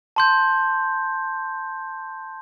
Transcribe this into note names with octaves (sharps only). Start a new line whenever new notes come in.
A5 C6 G6